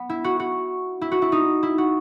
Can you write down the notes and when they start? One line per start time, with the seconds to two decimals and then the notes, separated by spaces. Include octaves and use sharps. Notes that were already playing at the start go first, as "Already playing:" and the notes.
Already playing: B3
0.09 E4
0.24 F#4
0.40 F#4
1.01 E4
1.11 F#4
1.22 E4
1.32 D#4
1.63 E4
1.78 F#4